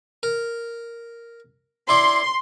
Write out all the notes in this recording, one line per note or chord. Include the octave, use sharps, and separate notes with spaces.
A#4
E4 D5 C6